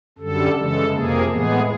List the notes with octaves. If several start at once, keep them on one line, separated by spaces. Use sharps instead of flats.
F#2 D3 G3 A4
C#3 E3 G#3 A4
F2 C3 F3 A#3 G#4
A2 E3 G#3 B3 G#4